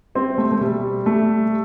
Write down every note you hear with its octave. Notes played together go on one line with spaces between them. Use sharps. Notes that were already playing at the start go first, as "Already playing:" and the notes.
G3 C4
A3
A3
B2 G3
G3 A3